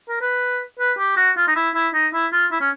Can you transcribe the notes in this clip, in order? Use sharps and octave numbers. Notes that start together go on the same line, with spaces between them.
A#4
B4
B4
G4
F#4
F4
D#4
E4
E4
D#4
E4
F4
E4
C#4